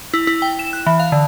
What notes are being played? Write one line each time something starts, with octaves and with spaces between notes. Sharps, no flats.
E4
E4
G5
E7
F#6
E3
F5
D3